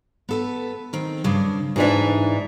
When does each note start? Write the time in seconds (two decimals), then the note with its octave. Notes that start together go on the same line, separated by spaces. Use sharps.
0.29 B3 A4 B4
0.93 D#3 C4
1.24 G2 C#3 D4
1.76 G#2 E3 D4 D#4 E5